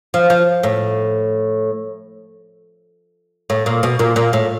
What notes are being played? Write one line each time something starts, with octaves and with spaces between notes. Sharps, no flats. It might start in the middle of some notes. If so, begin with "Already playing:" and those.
F3
F3
A2
A2
A#2
B2
A#2
A#2
A2